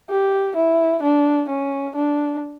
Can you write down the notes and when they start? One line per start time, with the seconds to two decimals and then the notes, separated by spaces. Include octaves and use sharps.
0.10 G4
0.56 E4
1.03 D4
1.49 C#4
1.95 D4